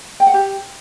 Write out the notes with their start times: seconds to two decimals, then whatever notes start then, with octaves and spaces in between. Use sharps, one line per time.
0.20 G5
0.27 F#5
0.34 G4